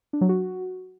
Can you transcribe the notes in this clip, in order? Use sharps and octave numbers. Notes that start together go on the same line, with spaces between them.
D4
F#3
F#4